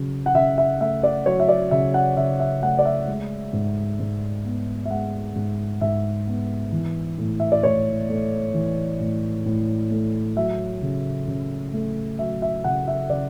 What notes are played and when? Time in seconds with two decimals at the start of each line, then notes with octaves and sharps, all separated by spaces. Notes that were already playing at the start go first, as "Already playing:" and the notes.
Already playing: C#3 F#3
0.26 F#5
0.34 C#3 E5
0.58 E5
0.80 A3 E5
1.03 D5
1.26 F#3 C#5
1.40 E5
1.48 D5
1.71 C#3 E5
1.94 F#5
2.16 C#3 E5
2.40 E5
2.63 A3 F#5
2.79 D5
2.85 E5
3.08 G#3
3.53 G#2
4.00 G#2
4.45 B3
4.85 E5
4.90 G#3 F#5
5.36 G#2
5.81 G#2 E5
6.27 B3
6.72 E3
7.18 A2
7.40 E5
7.52 D5
7.63 A2 C#5
8.09 A3
8.54 E3
9.00 A2
9.46 A2
9.91 A3
10.36 F#3 E5
10.82 C#3
11.28 C#3
11.73 A3
12.19 F#3 E5
12.42 E5
12.64 C#3 F#5
12.87 E5
13.10 C#3 D5